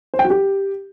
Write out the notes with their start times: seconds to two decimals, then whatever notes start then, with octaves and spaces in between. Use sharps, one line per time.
0.14 C5
0.19 G5
0.25 F#4
0.30 G4